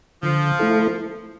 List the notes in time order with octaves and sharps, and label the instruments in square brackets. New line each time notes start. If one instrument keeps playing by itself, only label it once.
[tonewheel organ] D3 [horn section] F3
[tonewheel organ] A3 E4 A4